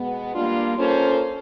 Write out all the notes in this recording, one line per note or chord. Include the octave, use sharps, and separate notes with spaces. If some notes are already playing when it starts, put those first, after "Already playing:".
Already playing: B2 G#3 B3
G3 A#3 D4 F4
A#3 C#4 F4 A4 C5